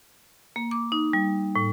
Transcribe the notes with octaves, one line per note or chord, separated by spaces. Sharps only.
A#3
D6
D#4
G3
A2